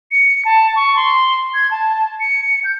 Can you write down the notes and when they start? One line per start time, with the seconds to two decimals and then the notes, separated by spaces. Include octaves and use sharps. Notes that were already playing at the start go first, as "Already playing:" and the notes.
0.12 C#7
0.45 A5
0.76 C#6
0.96 C6
1.54 G#6
1.71 A5
2.20 C#7
2.64 G6